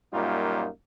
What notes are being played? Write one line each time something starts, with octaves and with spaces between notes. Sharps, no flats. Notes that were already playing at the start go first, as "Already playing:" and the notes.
F#2 A#2 G3 A#3 D#4 F4